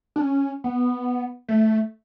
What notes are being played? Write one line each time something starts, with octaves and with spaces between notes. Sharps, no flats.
D4
C#4
B3
A3